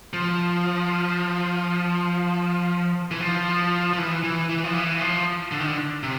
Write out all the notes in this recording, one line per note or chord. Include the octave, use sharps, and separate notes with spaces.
F3
E3
F3
F3
E3
E3
E3
F3
E3
F3
D3
D#3
D3
C3